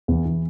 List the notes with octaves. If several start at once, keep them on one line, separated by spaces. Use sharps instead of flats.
E2 E3
E3